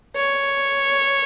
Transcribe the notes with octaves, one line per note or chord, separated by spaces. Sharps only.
C#5